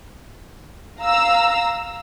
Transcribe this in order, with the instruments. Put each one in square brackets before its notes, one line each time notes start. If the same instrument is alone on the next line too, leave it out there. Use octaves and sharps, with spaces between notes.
[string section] F5 A#5 E6